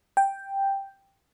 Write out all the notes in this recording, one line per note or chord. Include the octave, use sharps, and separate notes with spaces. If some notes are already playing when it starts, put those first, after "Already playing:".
G5